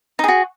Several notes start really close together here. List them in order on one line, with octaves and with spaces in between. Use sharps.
D#4 G#4 F#4